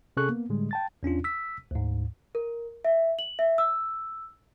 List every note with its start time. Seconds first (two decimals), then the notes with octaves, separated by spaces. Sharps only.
0.17 C3 C#4 G#4 A4 C#6 F#6
0.29 A#3 B3
0.50 A2 D3 G3 G#3
0.71 G5 A5 A6
1.03 E2 C#4 D4 F4
1.24 E6 B6
1.71 D2 G#2
2.35 A#4
2.85 E5
3.19 F#7
3.39 E5
3.58 E6